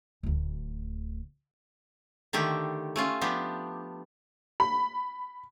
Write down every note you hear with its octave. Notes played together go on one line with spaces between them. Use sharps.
D1 D2
D3 D#3 A3 G4
A3 C#4 F4
F3 B3 D4 G4
B5